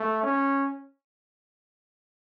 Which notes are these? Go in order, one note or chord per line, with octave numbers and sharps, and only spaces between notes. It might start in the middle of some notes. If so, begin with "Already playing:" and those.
Already playing: A3
C#4